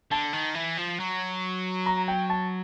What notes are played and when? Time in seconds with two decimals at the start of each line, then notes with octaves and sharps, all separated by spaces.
0.11 D3 A5
0.33 D#3
0.55 E3
0.77 F3
0.99 F#3
1.86 A#5
2.08 G5
2.30 A5